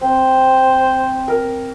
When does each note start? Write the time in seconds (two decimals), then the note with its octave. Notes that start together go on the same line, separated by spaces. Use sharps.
0.01 C4 C5
1.28 A#4